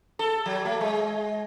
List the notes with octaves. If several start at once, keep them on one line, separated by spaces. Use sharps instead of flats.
A4
F#3
A3
G#3